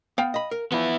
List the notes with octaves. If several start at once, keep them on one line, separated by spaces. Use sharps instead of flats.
B3 F5 G5
D#5 B5
A#4
F3 B3 E4